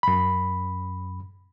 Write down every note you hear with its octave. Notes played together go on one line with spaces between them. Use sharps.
F#2 B5